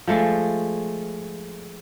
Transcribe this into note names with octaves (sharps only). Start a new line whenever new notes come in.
F3 G#3 A3